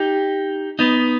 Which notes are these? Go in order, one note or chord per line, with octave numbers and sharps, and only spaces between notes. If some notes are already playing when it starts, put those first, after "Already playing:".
Already playing: D#4 G4
B3 D#4